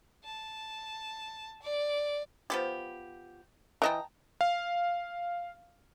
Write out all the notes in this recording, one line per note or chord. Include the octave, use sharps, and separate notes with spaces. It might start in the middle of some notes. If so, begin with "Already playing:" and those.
A5
D5
F3 B3 G4
E3 D#5 G5 A5 A#5
F5